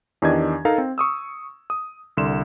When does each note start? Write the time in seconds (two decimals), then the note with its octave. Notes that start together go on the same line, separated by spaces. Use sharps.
0.22 E2 D#3 D4 G4 D#5 G#6
0.65 D#4 A4 A#4 D#5 F5 A#5
0.78 C4
0.98 C#6 D#6 E6
1.70 D#6
2.17 C2 D3 C6 E7